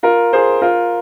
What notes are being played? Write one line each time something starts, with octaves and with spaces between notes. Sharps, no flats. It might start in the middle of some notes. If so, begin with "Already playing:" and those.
F4 A#4
G#4 C5
F4 A#4